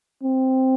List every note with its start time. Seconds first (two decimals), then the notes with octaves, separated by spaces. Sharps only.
0.24 C4